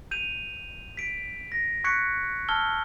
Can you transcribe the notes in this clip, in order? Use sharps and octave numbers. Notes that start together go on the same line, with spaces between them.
G6 D#7 F7
B6 D7
A#6
C#6 F#6 G#6 B6 C#7 D7
A5 E6 F6 G#6 G7